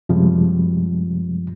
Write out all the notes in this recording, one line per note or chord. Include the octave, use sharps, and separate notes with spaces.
F#2 C3 F3 G3 G#3